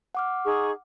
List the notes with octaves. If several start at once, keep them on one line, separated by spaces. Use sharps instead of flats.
F#5 D6 F6
D#4 G#4 C#6